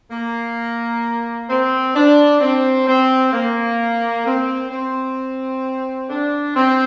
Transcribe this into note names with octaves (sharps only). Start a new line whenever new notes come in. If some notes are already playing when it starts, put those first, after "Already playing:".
A#3
C4
D4
C4
C4
A#3
C4
C4
D4
C4